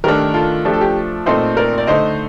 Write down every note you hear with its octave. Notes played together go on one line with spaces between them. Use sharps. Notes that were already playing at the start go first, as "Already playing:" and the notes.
D#3 A3 D4 G4 A#4
F4 A4
F3 A3 D4 G4
A4
G4
A#2 A3 C4 D#4 A4 C5
A#4 D5
D5
D3 A3 D#4 C5 D#5